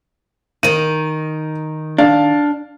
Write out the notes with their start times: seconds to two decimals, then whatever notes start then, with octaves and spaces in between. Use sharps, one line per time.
0.63 D#3 D#4 D#7
1.98 D4 F5